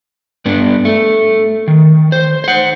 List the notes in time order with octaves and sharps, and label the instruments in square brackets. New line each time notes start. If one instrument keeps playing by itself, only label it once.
[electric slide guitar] G2 B3 D4
A3
D#3
C5
C5 F#5